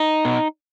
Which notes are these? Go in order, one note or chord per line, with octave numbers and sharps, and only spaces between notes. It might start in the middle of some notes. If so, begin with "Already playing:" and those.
Already playing: D#4
B2